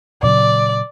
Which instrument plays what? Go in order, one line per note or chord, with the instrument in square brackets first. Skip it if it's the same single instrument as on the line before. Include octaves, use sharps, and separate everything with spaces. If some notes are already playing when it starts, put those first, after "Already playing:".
[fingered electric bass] A#2 C#3 F#3 [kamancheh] D5